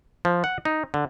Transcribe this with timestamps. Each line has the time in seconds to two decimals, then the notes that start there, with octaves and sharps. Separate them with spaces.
0.25 F3
0.44 F#5
0.65 D#4
0.94 D3